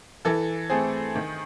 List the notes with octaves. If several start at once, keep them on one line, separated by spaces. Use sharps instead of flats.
E3 A4
A3 C4 G#4
D#3